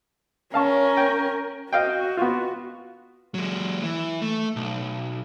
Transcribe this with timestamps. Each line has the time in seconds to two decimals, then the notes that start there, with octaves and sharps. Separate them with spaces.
0.54 C#4 A#4 F5 A5 C#6
0.97 G5
1.73 F#4 D#5 F5 G5
2.17 B3 F4
3.34 F#3 G#3
3.83 E3
4.22 A3
4.56 B1